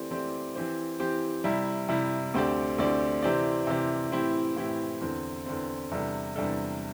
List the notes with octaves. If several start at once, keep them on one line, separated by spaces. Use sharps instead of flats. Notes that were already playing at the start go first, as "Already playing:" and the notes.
Already playing: E3 A3 C4 G4 D5
E3 A3 C4 G4 D5
E3 C4 G4 C5
E3 C4 G4 C5
C3 G3 E4
C3 G3 E4
D2 D3 C4 G4 D5
D2 D3 C4 G4 D5
C3 E3 C4 G4 D5
C3 E3 C4 G4 D5
A2 E3 C4 E4 G4
A2 E3 C4 E4 G4
E2 D3 C4
E2 D3 C4
E2 C3 G3 D4 A4
E2 C3 G3 D4 A4